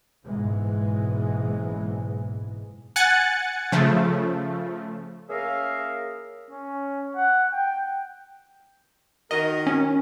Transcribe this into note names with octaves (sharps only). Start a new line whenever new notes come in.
F#1 G#2 B2 E3 G#3
F#5 G#5 F#6 A6 C#7
C#3 F3 A3
A#3 C#4 G#4 A#4 E5 F5
C#4
F#5
G5
D#3 F#4 A#4 D#5
C#4